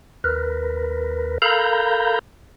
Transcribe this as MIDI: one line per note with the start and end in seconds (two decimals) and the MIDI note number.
0.24 1.38 39
0.24 1.38 70
0.24 1.38 71
1.42 2.19 69
1.42 2.19 70
1.42 2.19 77
1.42 2.19 82
1.42 2.19 83
1.42 2.19 91